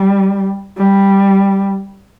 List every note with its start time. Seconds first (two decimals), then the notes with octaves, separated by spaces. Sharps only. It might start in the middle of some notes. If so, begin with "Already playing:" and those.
Already playing: G3
0.78 G3